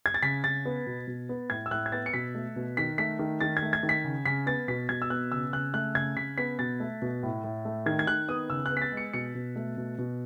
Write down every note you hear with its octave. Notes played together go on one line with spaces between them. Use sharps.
G#6
A6
C#3 B6
C#3 A6
B3
B2
B2
B3
A2 G#6
E6
A2 F#6
G#6
B3 A6
C#7
B2 B6
A3
B2
D#3 B6
A3 B6
D#3
D#3 A6
G#6
A3
G#6
D#3
B6
C#3
C#3 B6
B3 A6
B2 B6
B2 G#6
E6
B3 F#6
C#3 E6
C#3 F#6
A3 F#6
C#3 G#6
C#3 B6
B3 B6
B2 A6
A3
B2
A2
A2
A3
D#3 G#6
G#6
D#3 F#6
B3 D#6
C#3 E6
F#6
B3
B6
A6
G#3
C#7
B2 C#7
B2
A3
B2
B2